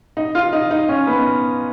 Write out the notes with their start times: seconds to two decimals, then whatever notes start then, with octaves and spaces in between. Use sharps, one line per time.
0.17 D#4
0.35 F4
0.53 D#4
0.71 D#4
0.89 C#4
1.07 B3